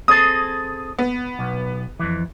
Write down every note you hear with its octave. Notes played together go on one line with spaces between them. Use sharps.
C4 G#4 A4 D#6
B3
B1
F2 E3